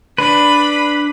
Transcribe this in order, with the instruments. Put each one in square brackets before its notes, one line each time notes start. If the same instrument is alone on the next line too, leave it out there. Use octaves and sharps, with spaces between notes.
[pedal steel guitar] D4 B4 [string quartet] B5